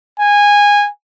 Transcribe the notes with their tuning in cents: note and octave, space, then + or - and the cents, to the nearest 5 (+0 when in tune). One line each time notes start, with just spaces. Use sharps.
G#5 -15